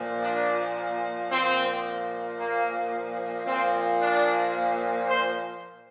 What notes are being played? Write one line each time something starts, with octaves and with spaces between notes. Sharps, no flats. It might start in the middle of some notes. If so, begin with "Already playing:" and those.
Already playing: A#2 F3
D4
A#2 F3 C4
A#3
A#2 F3 C4
D4
C5